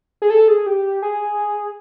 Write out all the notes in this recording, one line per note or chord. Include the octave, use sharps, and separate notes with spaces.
G#4
A4
G#4
G4
G#4